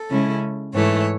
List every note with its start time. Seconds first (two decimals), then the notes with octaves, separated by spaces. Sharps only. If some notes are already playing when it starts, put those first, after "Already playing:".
Already playing: A4
0.09 C#3 G#3 C#4 E4
0.73 G#2 E3 A3 C#5